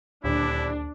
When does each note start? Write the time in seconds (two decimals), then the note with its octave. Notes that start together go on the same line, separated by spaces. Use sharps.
0.24 D#1 D2 D4 E4